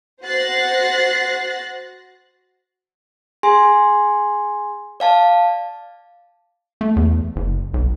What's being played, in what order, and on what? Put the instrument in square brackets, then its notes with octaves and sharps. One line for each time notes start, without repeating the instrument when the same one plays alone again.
[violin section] F#4 C5 F#6 A6 A#6 C7
[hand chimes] G#4 G#5 C6
D5 F5 A5
[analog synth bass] A3
E2
F#1
B1